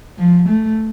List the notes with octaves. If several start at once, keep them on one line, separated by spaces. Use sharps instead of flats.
F3
A3